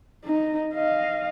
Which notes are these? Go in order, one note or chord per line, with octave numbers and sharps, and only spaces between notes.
D#4
D#5 F5